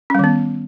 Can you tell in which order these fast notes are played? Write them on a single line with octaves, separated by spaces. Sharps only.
C#4 G3 D#3 B3